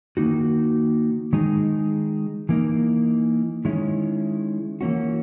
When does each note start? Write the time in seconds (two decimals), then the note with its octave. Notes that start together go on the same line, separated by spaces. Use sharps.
0.17 D#3 A#3 D#4 F#4
1.33 D#3 G#3 D#4 G#4
2.49 E3 A#3 D#4
3.65 D#3 G#3 C#4 E4
4.81 E3 A#3 C#4 F#4